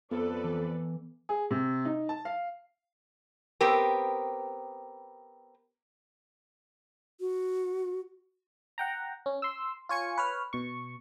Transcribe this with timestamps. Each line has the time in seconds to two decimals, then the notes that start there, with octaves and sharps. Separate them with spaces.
0.11 F2 B3 A4 B4 D5
0.44 E3
1.29 G#4
1.51 C3
1.85 D#4
2.09 A5
2.25 F5
3.61 B3 C4 G4 A#4
7.20 F#4
8.78 F#5 G5 A#5
9.26 C#4
9.42 C6 E6
9.89 F4 C#5 G#5 C#7
10.18 B4 C#5 F6
10.53 B2 C#6